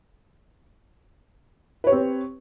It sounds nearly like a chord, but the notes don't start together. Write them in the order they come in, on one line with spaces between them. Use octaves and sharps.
B4 C#5 G4 C4